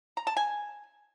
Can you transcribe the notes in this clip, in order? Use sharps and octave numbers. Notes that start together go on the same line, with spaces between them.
A#5
A5
G#5